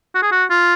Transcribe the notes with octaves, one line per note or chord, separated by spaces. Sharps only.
F#4
G#4
F#4
F4